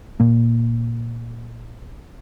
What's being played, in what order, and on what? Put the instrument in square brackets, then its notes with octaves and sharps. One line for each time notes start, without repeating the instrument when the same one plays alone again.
[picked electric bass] A#2 A#3